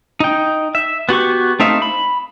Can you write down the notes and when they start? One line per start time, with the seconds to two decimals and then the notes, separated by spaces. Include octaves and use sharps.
0.20 D#4 G5
0.75 E5
1.09 B3 F#4 G4 C#6
1.60 A3 C4 D#4 E5 F5
1.82 B5